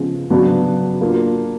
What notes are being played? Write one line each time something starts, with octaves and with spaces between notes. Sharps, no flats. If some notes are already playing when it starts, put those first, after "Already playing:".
Already playing: C#3 F3 G#3 B3
C#3 F#3 B3 D4 F#4
A#3 D4 F4